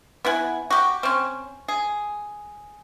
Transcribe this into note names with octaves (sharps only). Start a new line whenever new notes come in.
B3 E4 F#5 G#5
F#4 G4
C4 C#4
G#4